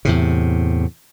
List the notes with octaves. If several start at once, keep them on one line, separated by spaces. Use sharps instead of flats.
E2 A2 C3